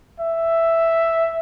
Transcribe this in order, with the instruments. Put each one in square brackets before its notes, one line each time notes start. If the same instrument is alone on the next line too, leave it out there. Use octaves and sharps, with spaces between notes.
[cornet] E5